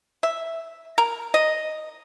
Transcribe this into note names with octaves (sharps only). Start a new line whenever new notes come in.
E5
A#4
D#5